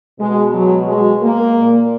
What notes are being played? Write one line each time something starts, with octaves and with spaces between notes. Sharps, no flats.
B2 G#3
F#3
G#3
A#3
A#2